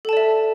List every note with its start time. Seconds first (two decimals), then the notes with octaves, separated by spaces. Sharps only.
0.05 A4
0.09 A5
0.13 D5
0.17 E5